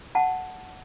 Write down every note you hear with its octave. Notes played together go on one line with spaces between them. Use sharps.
F#5 A5